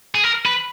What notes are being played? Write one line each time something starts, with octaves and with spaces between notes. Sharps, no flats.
G#4
A#4
B4